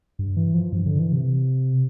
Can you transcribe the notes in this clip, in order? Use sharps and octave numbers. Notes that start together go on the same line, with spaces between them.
G2
E3
F3
G2
D3
E3
C3